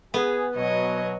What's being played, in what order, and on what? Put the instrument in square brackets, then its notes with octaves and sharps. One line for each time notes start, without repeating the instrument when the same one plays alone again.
[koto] B3 [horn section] G#4
[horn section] B2 F#3 [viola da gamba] C#5 D#5